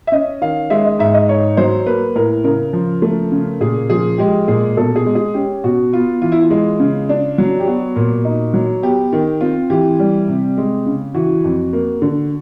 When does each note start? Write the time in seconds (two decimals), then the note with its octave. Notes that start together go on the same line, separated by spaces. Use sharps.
0.07 E5
0.12 C#4 D#5
0.41 D#3 F5
0.70 G#3 E5
0.85 D#5
0.99 G#2 E5
1.14 D#5
1.29 D#4 C#5
1.57 F#3 C5
1.86 A#3 B4
2.15 A2 A#4
2.44 C#3 A#4
2.73 F3
3.02 A3
3.32 C#3
3.61 A#2 G#4
3.90 F3 G#4
4.18 G#3 G4
4.48 A#2 G#4
4.77 B2 A4
4.96 G#4
5.06 G#3
5.15 G#4
5.34 C#4 G4
5.64 B2 F#4
5.93 B3 F4
6.22 E3 F4
6.32 E4
6.41 F4
6.50 G#3
6.80 C#3
7.09 D4
7.38 F#3
7.60 G4
7.67 B3 F#4
7.96 A#2
8.25 D#4
8.54 F#3
8.82 B3 G4
9.13 D#3
9.41 C4 F4
9.70 E3 G4
9.99 G3
10.28 C3
10.57 G#3
10.86 C#3
11.14 E3 F#4
11.44 F2
11.73 A#3
12.02 D3